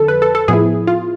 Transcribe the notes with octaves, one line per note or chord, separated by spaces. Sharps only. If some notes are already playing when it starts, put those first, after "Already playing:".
Already playing: F2 D3 F3 A4
B4
A4
A4
A2 F3 B3 E4 G#4
F4